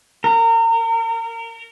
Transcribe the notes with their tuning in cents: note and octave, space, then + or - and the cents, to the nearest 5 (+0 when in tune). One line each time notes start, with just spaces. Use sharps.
A#4 -30